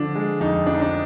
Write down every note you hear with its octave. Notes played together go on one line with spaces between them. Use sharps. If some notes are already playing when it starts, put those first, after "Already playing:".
Already playing: D3 F3 D4
G#3
F2 D#4
F3 D4
D#4
D4